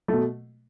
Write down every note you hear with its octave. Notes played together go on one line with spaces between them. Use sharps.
B2 A3